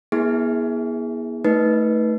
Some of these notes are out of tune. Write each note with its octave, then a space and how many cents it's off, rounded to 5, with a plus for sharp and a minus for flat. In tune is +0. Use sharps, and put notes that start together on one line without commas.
B3 -45 E4 -30 G#4 +0
A3 +10 D#4 +25 B4 -15